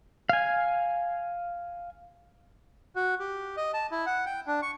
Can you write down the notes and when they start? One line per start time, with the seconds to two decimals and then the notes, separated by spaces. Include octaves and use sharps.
0.29 F5 G#5
2.96 F#4
3.20 G4
3.57 D#5
3.74 A5
3.91 E4
4.06 F#5
4.26 G5
4.47 D4
4.62 C#6